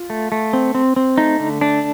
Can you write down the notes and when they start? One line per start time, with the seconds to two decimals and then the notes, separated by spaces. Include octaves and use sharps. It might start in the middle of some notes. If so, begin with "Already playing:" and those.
Already playing: F4
0.10 A3
0.32 A3
0.53 C4
0.75 C4
0.96 C4
1.18 A3 D#4
1.40 D3
1.61 A3 D4